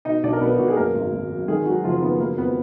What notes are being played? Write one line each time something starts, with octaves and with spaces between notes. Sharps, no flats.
B2 D#4 D#5
B1 D4 D5
A#4
B1 B3 B4
B1 F#4
G#4
F#2 A#3 A#4
G#1
G#1
F#3
D#3 G#3 G#4
F#3 G#3 F#4
F#1 F3 F4
D#3 B3
F#3 A#3
F2 B3